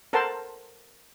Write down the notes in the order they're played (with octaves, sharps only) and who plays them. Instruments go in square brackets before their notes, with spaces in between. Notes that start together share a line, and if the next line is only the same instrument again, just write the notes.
[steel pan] A4 A#4 C5 F#5 A5 C6